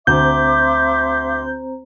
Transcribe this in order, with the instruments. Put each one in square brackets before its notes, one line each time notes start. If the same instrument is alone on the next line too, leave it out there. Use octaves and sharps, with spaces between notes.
[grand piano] D2 [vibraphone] C4 C5 A#5 [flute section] E5 C6 D6 [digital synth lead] G6